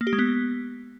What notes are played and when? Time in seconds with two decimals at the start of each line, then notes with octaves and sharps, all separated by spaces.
0.01 A#3
0.07 G4
0.13 G#3
0.19 B3